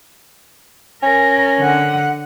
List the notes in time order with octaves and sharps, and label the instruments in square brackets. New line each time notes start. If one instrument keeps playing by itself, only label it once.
[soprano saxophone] C#4 [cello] A#4
[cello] D3 F#5